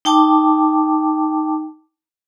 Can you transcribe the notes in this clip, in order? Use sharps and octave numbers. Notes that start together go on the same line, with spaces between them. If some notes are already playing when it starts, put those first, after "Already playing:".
D#4 G5 A5 D6